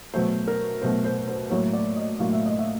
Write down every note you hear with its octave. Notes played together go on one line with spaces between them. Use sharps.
B2 F#3 A3 C5
A#4
B2 F#3 A3 C5
C5
C5
A2 F#3 A#3 C#5
D5
D#5
A2 F#3 A#3 F5
E5
D#5
E5